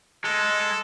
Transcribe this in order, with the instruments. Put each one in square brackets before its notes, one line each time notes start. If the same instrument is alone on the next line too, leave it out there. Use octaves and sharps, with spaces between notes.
[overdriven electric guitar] G#3 [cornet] A4